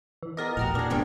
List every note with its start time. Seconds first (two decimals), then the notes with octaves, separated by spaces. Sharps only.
0.23 E3
0.37 B3 F4 G#4 A#4 D5 D#5
0.57 E1 A#1 A2 F#4 G4 F#5 A#5 F6
0.75 A#2 D4 G#4 A#4
0.90 D1 G2 C3 A3 B3 G5 G#5